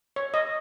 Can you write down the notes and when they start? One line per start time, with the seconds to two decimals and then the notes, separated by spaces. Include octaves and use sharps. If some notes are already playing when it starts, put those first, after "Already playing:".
0.16 C#5
0.34 D#5